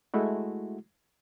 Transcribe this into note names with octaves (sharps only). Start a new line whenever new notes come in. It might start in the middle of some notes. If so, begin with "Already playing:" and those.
G#3 A3 E4 F#4